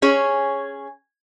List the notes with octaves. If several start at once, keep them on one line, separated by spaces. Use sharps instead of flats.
C#4 G#4 C#5